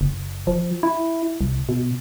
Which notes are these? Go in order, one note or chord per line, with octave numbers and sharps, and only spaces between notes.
F#1
F3
E4
C2
B2